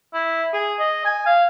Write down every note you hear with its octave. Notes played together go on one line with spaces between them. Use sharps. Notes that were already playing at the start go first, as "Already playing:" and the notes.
E4
G#4
D#5
G#5
F5